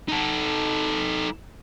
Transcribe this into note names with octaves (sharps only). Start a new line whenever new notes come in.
D#4 A4